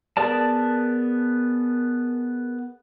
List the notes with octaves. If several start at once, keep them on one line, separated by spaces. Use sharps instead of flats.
B3 G#4 A#4 D5 A5